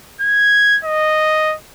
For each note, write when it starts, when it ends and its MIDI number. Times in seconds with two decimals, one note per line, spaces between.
0.21 0.78 92
0.85 1.55 75